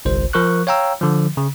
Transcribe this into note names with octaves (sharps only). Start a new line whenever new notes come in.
G1 C2 C5
F3 A#4 C#6 F#6
C#5 F5 G5 A#5 E6
D3 F3
C#3